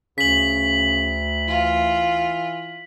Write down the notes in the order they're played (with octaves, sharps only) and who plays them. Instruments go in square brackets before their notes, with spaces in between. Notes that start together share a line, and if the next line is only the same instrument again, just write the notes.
[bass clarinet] D2 [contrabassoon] C#3 [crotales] B6 F#7
[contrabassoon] E3 [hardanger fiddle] F4